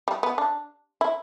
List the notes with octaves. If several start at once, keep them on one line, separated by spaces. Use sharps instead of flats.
G3
B3
D4
E4